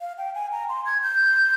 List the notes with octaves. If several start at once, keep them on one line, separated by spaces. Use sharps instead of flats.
F5
G5
G#5
A#5
C6
G#6
G6